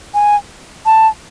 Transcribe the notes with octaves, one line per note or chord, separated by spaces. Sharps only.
G#5
A5